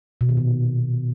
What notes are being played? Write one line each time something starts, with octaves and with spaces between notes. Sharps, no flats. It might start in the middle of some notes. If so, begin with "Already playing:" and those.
B2
D#3
A#2